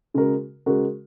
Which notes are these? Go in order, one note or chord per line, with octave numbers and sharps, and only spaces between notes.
C#3 G#3 F#4 A#4
C#3 G#3 F#4 A#4